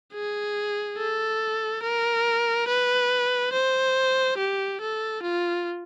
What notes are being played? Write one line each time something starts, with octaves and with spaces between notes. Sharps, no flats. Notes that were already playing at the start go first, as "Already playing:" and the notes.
G#4
A4
A#4
B4
C5
G4
A4
F4